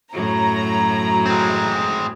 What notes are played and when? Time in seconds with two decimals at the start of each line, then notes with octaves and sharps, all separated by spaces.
0.13 F#2 A2 F#3 A#5
1.26 G#3 C4